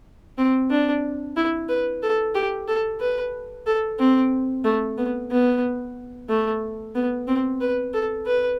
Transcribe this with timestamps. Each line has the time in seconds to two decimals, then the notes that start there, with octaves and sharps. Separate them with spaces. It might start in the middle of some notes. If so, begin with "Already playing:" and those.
0.38 C4
0.70 D4
1.36 E4
1.69 B4
2.02 A4
2.35 G4
2.68 A4
3.00 B4
3.66 A4
3.99 C4
4.64 A3
4.97 B3
5.31 B3
6.29 A3
6.95 B3
7.28 C4
7.61 B4
7.93 A4
8.26 B4